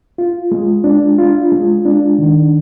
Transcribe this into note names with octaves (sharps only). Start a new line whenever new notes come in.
F4
G#3
D4
F4
G#3
D4
D#3